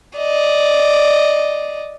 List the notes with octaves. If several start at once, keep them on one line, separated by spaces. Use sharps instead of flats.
D5 D#5